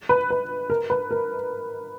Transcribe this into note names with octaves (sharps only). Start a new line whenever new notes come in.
B4
B4
A#4
B4
A#4